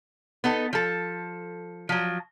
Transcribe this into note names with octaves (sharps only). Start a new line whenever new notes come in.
B3 D#4 A4
F3 A4
F3 F#3